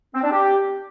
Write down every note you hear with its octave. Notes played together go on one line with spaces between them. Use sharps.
C4
D4
G4